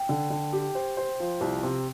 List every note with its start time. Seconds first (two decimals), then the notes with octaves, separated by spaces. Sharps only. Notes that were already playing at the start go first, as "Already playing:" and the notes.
Already playing: G5
0.09 D3
0.30 D3
0.53 G4
0.75 C5
0.97 C5
1.20 F3
1.41 C2
1.63 C3